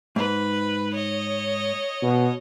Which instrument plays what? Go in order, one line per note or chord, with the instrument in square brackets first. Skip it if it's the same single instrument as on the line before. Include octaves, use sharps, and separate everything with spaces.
[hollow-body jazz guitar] G#2 [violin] B4
[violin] C#5 D#5
[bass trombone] B2